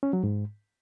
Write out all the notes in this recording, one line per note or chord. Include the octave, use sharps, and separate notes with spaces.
C#4
F#3
G#2